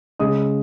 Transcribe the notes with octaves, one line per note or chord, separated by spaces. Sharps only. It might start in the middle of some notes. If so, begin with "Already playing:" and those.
C#3 G#3 D#5 D#6